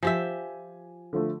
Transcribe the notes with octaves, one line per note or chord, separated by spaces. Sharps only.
F3 G4 E5 G#5
D3 F3 A3